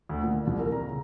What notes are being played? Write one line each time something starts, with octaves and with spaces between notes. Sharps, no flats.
D2
A#2
C2
A#4
A#5
C#3